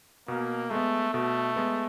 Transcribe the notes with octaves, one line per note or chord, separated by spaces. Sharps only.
B2 A#3
G#3 A3 B3
B2 A3
G#3 B3